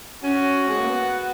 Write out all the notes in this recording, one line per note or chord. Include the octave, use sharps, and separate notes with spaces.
C#4 F#4
G#3
A#3
B3